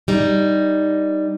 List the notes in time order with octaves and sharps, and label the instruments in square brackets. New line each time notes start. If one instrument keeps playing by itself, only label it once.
[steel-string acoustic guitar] G3 D#4